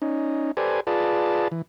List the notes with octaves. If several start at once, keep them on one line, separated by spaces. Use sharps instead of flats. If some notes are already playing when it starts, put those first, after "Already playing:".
C#4 D#4
G4 A4 B4 C5 D5 G#5
F4 G#4 B4 D5 A5
E3